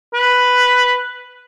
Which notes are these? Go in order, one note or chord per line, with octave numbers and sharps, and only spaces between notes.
B4